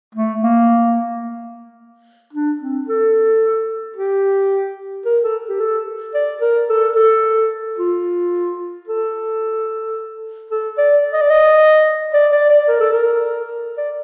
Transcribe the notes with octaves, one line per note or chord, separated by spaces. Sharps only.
A3
A#3
D4
C4
A4
G4
A#4
A4
G4
A4
D5
A#4
A4
A4
F4
A4
A4
D5
D#5
D5
D#5
D5
D5
D5
A#4
A4
A#4
D5